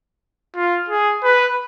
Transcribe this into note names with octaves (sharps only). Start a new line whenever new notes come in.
F4
G#4
B4